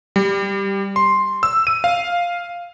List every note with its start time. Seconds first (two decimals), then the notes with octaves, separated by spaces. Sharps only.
0.16 G3
0.96 C6
1.43 E6
1.67 D#7
1.84 F5